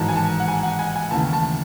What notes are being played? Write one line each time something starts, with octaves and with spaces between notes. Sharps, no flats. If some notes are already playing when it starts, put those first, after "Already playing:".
Already playing: A1 G#2 D#3 F#3 A5
G#5
A5
F#5
G#5
F#5
G#5
G#5
D#2 C#3 E3 A3 A5
A5